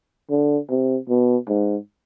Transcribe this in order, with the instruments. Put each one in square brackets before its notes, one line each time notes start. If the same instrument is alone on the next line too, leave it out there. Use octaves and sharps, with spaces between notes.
[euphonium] D3
C3
B2
G#2